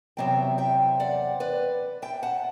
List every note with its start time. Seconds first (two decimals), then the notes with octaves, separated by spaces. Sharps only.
0.17 E2 C3 F#3 C4 E5 G5
0.58 E5 G5
1.00 D5 F#5
1.40 B4 D5
2.02 E5 G5
2.23 F#5 A5